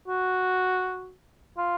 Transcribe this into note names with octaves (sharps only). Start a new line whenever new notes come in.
F#4
F4